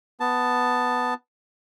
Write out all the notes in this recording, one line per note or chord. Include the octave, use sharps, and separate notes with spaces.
B3 A5